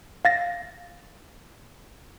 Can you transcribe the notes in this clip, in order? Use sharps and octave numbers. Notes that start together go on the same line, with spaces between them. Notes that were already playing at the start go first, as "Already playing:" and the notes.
F5 A6 A#6